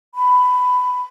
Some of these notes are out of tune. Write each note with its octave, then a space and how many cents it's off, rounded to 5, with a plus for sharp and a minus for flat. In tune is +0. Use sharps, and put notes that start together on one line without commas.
B5 +15